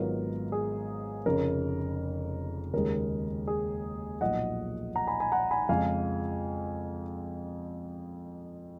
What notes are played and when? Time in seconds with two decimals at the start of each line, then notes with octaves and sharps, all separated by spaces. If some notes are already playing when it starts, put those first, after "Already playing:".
Already playing: G#1 G#2 F#3 B3 F4 A#4
0.52 G#4
1.26 F1 F2 C#3 A#4
2.73 D#2 C#3 G#3 A#4
3.47 G#4
4.21 B1 A#2 F3 D#5 F#5
4.95 F#5 A#5
5.07 G#5 B5
5.20 G#5 B5
5.32 F#5 A#5
5.51 G#5 B5
5.69 F2 C#3 F3 G#3 F5 G#5